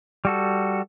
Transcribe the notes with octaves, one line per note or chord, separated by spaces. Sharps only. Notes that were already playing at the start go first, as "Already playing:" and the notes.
G3 F#4 A4